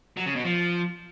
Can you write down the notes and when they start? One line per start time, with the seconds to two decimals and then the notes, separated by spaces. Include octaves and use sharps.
0.17 F#3
0.26 C#3
0.35 B2
0.44 F3